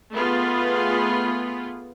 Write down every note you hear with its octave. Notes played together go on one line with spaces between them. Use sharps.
A3 B3 F4 G#4 B4